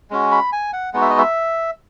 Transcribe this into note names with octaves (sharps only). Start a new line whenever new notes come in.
G#3 C#4 F#4
B5
G#5
F#5
G#3 B3 D#4 F#4 F#5
E5
D#5
E5